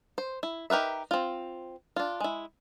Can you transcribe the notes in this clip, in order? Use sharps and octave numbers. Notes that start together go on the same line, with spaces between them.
C5
E4
D#4 G4 A#4 B4 E5
C4 F4
D4 F4
G#3 E4